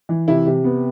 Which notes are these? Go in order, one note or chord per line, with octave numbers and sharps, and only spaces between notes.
E3
C3 E4
C3
B3